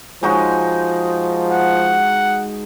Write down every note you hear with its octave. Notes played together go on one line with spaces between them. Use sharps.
F3 G#3 D#4 F#4
F#5